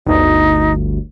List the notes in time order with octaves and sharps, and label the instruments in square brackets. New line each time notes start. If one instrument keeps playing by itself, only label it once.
[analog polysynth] G1 D2 [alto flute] D#4